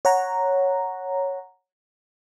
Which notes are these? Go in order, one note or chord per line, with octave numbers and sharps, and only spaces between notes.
C#5 F#5 A#5